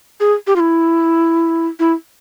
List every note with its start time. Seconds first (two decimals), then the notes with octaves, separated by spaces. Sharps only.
0.20 G#4
0.47 G4
0.56 F4
0.60 E4
1.80 E4